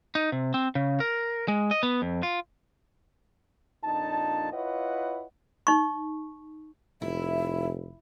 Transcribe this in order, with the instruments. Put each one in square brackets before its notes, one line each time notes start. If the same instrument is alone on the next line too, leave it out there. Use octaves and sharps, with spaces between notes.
[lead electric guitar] D#4
C3
C4
C#3
A#4
G#3
D#5
B3
F2
F4
[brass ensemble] F2 A#2 D4 D#4 A5
E4 F4 B4 C#5 D#5 F#5
[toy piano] D#4 C#6
[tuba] F1 [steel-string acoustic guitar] E4 [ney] E5